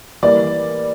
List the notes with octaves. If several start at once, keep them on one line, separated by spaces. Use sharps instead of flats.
E3 G3 A#3 D5